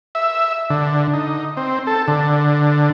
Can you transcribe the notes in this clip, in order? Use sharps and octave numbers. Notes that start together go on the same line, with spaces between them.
E5
D3
D#4
C4
A4
D3